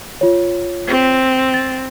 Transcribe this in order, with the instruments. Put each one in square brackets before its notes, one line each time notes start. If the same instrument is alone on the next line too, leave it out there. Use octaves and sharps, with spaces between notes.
[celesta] F4 C#5
[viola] C4
[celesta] A6